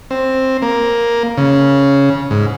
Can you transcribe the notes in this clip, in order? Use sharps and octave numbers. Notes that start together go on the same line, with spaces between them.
C4
A#3
C#3
G#2